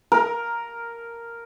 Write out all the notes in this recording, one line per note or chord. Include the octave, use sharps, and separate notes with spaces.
A#4